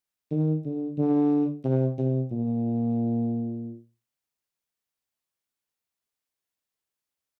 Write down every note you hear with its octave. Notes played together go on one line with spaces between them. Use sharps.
D#3
D3
D3
C3
C3
A#2